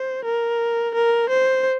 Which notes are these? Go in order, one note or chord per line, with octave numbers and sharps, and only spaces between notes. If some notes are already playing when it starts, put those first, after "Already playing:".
Already playing: C5
A#4
A#4
C5